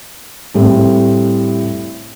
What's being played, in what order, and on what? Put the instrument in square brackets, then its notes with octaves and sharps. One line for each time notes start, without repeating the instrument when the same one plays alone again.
[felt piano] A2 G3 A3 C4